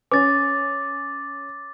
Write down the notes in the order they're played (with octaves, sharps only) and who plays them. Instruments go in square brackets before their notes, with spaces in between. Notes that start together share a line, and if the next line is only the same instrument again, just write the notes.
[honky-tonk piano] C#4 [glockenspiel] D6 A6